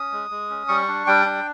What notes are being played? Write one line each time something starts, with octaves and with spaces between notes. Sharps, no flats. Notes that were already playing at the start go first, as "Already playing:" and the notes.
Already playing: C#4 D#6
G#3
G#3
C#4
G3 C#6
D4
G3 G5
D4